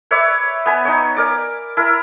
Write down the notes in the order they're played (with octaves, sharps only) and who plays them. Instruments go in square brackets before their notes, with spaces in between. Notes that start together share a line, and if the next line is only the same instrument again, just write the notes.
[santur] B4 C#5 D5 E5
B3 G#5 B5
D#4 C#5
A#4 D5
E4 A#4